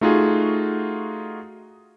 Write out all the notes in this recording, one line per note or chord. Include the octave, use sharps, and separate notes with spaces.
A3 D#4 F4 F#4 G#4